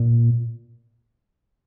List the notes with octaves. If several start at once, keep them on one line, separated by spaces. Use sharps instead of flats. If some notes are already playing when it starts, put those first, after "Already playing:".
Already playing: A#2